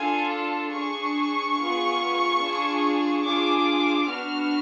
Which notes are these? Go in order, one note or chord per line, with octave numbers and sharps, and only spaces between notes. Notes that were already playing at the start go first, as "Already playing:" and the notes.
Already playing: D4 F4 A4 G#5
A5
D4 G#4 C#6
B3 F4 G#4
D4 F4 G#4
D4 F4 G#4 D6
B3 D4 F#4 F6